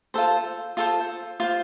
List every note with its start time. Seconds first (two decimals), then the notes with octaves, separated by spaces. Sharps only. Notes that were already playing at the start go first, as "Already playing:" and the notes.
0.14 F4 A4 C5
0.77 F4 A4 C5
1.40 F4 C5 F5